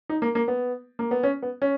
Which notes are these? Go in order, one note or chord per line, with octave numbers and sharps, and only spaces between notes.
D#4
A#3
A#3
B3
A#3
B3
C#4
B3
C#4